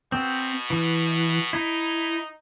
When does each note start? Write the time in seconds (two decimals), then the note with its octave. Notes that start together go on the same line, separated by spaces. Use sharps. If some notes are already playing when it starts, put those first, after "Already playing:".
0.12 B2 C4
0.70 E3
1.53 D#4 E4